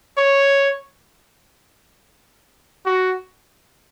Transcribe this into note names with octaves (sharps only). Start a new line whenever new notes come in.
C#5
F#4